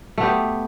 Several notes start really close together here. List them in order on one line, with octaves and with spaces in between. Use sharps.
A3 B3 G4